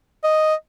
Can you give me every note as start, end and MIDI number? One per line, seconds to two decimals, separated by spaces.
0.24 0.54 75